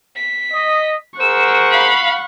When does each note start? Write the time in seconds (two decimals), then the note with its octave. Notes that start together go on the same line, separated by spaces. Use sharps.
0.16 B6
0.53 D#5
1.20 G#4 A#4 C5 F#5 C#6 E6
1.70 F5 B5